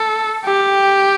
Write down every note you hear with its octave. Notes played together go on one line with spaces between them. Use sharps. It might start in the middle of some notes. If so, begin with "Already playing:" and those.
Already playing: A4
G4